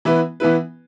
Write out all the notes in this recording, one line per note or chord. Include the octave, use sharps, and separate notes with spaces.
E3 B3 E4 B4
E3 B3 E4 B4